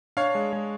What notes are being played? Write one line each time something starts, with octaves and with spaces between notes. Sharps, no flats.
D4 C#5 F5
G#3
G#3